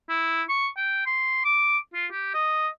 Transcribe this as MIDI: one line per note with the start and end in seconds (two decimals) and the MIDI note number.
0.10 0.43 64
0.49 0.68 85
0.77 1.05 79
1.06 1.43 84
1.45 1.78 86
1.94 2.07 65
2.11 2.30 67
2.34 2.68 75